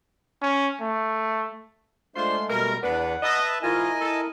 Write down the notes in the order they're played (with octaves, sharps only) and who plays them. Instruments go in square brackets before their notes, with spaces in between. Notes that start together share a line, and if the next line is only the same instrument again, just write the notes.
[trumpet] C#4
A3
[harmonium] G#3 A3 [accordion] D4 C5 [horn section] F4 C6
[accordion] B2 G3 [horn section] A#4
[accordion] E2 [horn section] B3 D4 B4 [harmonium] F#5
[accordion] B4 E5 A5 [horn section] D#5
[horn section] G#2 E3 F4 [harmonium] E4 A#4 [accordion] D#5 G#5
[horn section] A4